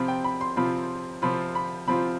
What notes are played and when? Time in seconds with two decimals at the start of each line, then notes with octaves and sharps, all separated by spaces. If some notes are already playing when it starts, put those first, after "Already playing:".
Already playing: C3 F3 C4 F4 B5
0.08 G5
0.24 B5
0.41 C6
0.56 C3 F3 C4 F4 B5
1.22 C3 F3 C4 F4 B5
1.55 B5
1.87 C3 F3 C4 F4 B5